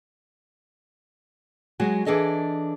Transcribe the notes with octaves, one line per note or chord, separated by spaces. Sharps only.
F#3 G#3 F#4
E3 D4 G#4 A4 D#5